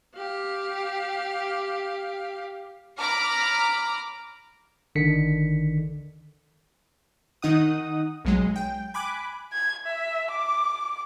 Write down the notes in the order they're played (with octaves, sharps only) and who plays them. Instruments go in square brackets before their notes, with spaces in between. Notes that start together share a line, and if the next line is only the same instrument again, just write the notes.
[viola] G4 F5
[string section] A#5 B5 D6 F6
[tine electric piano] A1 D3 D#3 B6 C#7
[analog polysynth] D#3 D#4 F#5 D#6
B1 F#3 G#3
G5
G#5 B5 D6 F#6
[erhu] G#6
E5
D6